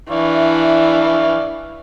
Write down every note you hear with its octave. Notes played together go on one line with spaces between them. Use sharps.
E3 D4 D5 E5 F5 C#6